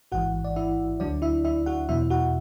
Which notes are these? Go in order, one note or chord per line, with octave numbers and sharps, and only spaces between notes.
A1 G#2 E3 F#4 F#5
D5
E4 E5
D2 D3 F#3 D4 D5
E4 E5
E4 E5
F#4 F#5
E2 B2 F#3 E4 E5
F#4 F#5